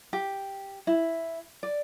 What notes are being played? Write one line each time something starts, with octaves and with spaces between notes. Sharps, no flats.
G4
E4
D5